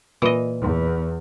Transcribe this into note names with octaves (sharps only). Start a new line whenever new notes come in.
A#2 E3 D#5
E2